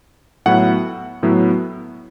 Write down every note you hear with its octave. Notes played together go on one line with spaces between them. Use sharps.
A2 F#3 B3 E4 F#5
A2 F#3 B3 E4